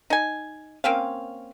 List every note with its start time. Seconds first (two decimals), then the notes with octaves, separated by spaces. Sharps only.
0.10 D#4 G#5
0.84 A#3 C4 C#4 F5